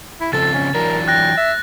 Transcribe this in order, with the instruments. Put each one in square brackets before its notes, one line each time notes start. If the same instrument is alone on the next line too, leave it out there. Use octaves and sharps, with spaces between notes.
[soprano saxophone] E4
[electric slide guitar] C#3 F3 C4 [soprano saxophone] A4 [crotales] A6
[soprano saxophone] C#4
[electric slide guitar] E3 F#3 D4 [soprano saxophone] A#4
[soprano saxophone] G5 [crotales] F#6 A#6
[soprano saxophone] E5